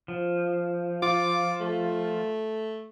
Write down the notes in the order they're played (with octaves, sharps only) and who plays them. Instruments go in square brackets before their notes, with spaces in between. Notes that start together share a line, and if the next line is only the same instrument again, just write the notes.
[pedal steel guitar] F3
[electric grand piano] F4 [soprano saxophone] D6
[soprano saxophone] A3